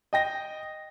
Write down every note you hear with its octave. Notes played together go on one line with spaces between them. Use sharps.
D#5 G5 A#6